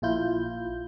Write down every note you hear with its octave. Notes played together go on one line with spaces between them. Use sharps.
A#1 A#2 E4 F4 G6